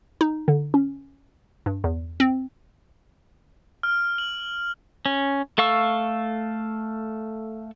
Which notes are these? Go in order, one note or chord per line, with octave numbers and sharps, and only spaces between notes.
D#4
D3
C#4
G2
E2
C4
F6
F#7
C#4
A3 A4 F5 C#6 E6